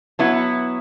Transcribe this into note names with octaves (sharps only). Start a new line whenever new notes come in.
F#3 B3 E4